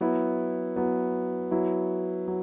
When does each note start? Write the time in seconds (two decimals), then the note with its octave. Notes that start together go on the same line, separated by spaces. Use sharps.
0.01 F#3 B3 E4
0.76 F#3 B3 E4
1.51 F#3 B3 E4
2.28 F#3